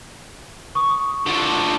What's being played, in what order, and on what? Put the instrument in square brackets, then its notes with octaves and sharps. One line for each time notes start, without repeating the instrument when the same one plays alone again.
[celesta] C#6 D#6
[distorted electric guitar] D3 F3